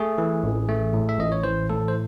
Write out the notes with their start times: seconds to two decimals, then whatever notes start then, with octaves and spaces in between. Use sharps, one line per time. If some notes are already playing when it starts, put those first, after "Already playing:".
Already playing: A3 G#4
0.18 E3
0.43 A1
0.69 A3
0.93 A2
1.09 E5
1.19 A1 D#5
1.32 C#5
1.43 E3 C5
1.69 A2 A4
1.88 C5